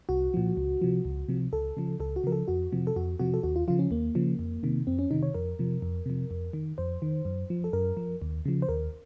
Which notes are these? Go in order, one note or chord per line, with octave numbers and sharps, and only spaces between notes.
C2 F#4
A#2 F3
C#2
C3 F3
C#2
C3 F3
C#2 A4
C#3 F3
C#2 A4
F#4
C#3 F3 A#4
A4
F2 F#4
C3 F3
A4
F2 F#4
C3 F3 F#4
A4
D#2 F#4
F4
C#3 F3 F4
C#4
D#2 A#3
C#3 F3
F2
C3 D#3
F2 C4
C#4
C3 D#3 D#4
C#5
F2 A#4
C3 F3
F2
C3 F3
F2
D#3
F2 C5
D#3
F#2
F3
A4
F#2 A#4
F3
D#2
C#3 F3
C5
D#2 A#4